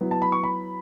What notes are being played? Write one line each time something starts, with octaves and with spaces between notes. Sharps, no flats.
F#3 B3 E4
A5
B5
C#6
B5